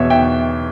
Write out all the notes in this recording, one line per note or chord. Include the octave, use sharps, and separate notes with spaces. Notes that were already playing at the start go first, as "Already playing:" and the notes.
Already playing: E2 B2 C#5 E5
E5 G5